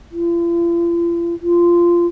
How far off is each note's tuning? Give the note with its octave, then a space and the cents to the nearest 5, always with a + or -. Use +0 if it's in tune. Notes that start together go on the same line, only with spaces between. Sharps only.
F4 -45
F4 -15